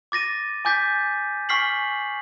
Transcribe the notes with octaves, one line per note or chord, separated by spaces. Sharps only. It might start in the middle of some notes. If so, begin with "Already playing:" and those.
D6 A6 A#6 D#7
G#5 D6 G6 A6 B6
G#5 C#6 F6 B6 C7 F#7